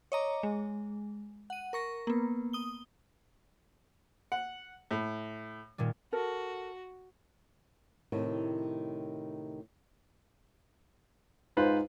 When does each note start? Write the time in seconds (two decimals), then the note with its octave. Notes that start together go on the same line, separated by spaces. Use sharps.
0.12 C#5 D#5 A#5 D6
0.43 G#3
1.50 F#5 D#7
1.73 A#4 C#6 A#6
2.07 A#3 B3
2.53 D#6 G7
4.32 F#5
4.91 A2
5.78 A#2 D#3 G3
6.13 F#4 A4 A#4
8.12 A2 C3 D#3
11.57 G#2 F4 B4 C5